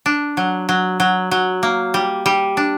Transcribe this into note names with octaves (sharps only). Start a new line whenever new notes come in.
D4
F#3
F#3
F#3
F#3
A#3
G3
G3
D4